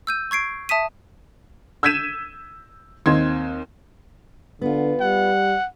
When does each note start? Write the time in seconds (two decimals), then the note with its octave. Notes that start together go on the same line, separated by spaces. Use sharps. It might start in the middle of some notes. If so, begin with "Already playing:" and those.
0.07 E6 G6 D#7
0.31 C#6 G#6 C7 D7
0.69 E5 A5 D#6 B6 D#7
1.83 E6 G6 G#6 B6 D#7 E7
3.06 D#2 C4 D#4 C6 G#6
4.62 D3 B3 F4
5.00 G3 F#5